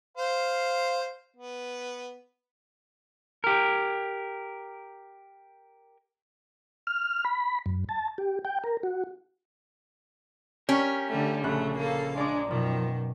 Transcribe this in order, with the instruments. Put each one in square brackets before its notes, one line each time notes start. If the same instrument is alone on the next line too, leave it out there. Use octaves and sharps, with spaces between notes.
[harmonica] C5 F5
B3
[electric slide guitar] G4 A#4
[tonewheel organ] F6
B5
F#2
A5
G4
G5
A#4
F#4
[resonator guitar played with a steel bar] C#4 [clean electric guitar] G4 A#4 [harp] D7
[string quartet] D3 G3 A3
[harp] A#1 B5 F#6 [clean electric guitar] C#3 [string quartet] A3
[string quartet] A#3 A4 F5
[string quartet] G#3 D4 [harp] D5 A#5 D6
[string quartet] F#2 D#3 [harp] B2 [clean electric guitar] F3